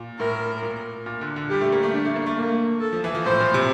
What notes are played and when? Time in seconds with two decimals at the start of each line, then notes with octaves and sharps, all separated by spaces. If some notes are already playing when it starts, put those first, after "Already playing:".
Already playing: A#2
0.19 A2 A#4
0.62 A#2
1.06 A#2
1.21 D3
1.36 D3
1.50 G3 G4
1.61 A3
1.72 A#3
1.83 A3
1.94 D4
2.05 A3
2.16 A#3
2.26 A3
2.38 A#3
2.81 A4
2.93 F3
3.04 E3
3.15 F3
3.25 A2 C5
3.40 A#2
3.54 C3